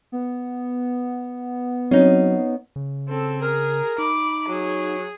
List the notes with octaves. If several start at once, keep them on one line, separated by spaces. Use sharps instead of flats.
B3
F#3 C4 C#4 D#4
C#3
C4 A4
G#4 A#4
D#4 B5 D6
F#3 G#4